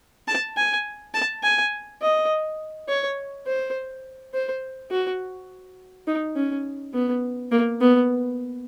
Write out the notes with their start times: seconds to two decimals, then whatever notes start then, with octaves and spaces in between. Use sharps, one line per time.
0.28 A5
0.57 G#5
1.14 A5
1.43 G#5
2.02 D#5
2.89 C#5
3.47 C5
4.34 C5
4.91 F#4
6.07 D#4
6.36 C#4
6.94 B3
7.52 A#3
7.81 B3